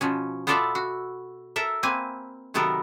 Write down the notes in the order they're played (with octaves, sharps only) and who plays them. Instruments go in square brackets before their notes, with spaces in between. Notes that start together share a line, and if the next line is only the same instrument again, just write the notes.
[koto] B2 F3 C#4
B3 F4 A4 D5 E5 F5
F#4
A4 A#4 E5
A#3 C4 B4 G#5
C3 D#3 F#3 B3 A4 A#4